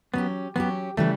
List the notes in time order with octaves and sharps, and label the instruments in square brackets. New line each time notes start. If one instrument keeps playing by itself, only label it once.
[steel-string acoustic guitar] F#3 C#4 G4 [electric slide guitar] B3
[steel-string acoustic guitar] F#3 C#4 G4 [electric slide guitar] B3
[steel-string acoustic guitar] C#3 E3 G3 [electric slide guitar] A3